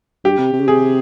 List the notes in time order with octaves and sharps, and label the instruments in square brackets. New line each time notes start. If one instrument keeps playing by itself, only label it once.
[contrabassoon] G2 [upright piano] G4
[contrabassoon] C3
C3
C#3
[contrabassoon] C3 [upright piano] G#4